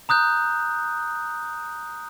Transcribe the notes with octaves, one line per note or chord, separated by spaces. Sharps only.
A#5 D#6 F#6 G6